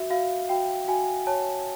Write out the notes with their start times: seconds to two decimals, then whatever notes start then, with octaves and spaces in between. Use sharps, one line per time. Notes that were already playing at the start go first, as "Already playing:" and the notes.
Already playing: F#4 E5
0.10 F#4 F5
0.49 F#4 G5
0.88 F#4 G#5
1.27 C#5 A5